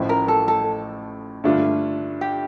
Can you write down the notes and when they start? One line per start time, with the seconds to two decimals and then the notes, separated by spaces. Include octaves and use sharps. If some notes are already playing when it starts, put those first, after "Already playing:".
Already playing: A1 A2 F3
0.09 A#4
0.28 A4
0.48 A4
1.44 G2 D3 A3 D4 F4
2.21 G4